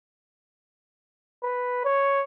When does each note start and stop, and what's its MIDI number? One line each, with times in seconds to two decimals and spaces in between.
1.43 1.80 71
1.85 2.23 73